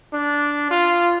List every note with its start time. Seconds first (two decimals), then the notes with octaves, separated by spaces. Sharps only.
0.13 D4
0.71 F4